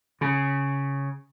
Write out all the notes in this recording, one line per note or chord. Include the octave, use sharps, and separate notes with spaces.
C#3